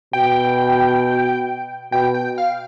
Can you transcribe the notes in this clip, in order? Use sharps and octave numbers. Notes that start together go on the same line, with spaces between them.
B2 G5
B2 G5
G5
F5